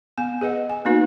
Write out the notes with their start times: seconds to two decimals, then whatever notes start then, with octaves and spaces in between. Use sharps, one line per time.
0.18 B3 G#5
0.41 G#4 B4 D#5 F#5
0.70 G#5
0.85 A#3 B3 D#4 F#4 B4